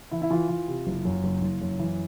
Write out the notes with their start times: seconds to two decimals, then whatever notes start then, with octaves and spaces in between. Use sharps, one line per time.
0.11 E3 E4
0.22 E4
0.30 E3 F4
0.49 E3
0.68 C3
0.87 F#1
1.05 F#2
1.23 F#1
1.42 F#1
1.61 F#2
1.79 E3